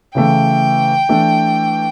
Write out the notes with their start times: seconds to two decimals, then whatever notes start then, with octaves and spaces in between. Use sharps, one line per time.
0.15 C#3 E3 A3 G5
1.09 E3 A3 D4